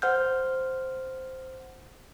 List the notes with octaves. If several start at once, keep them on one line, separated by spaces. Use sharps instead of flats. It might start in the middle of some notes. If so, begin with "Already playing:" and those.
C5 F#5 F6 G6